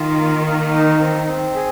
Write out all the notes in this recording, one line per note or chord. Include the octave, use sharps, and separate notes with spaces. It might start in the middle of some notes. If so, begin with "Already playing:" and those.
Already playing: D#3 F4
A#3
A#3
D#4
C4
C4
G#4